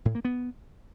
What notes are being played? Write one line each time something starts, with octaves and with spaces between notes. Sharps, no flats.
A2
A#3
B3